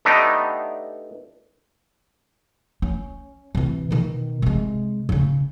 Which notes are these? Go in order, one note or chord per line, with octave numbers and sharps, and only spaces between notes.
A3 B3 D4 D#4 G4
C#4
C3 E3
B2 D#3
C3 G#3
C#3 C#4